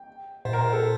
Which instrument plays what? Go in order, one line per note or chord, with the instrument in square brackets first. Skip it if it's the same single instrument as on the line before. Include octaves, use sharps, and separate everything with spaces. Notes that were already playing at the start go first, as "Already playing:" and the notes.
Already playing: [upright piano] G5
[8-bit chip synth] A#2 [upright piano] C5
[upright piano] A#4
C5
A4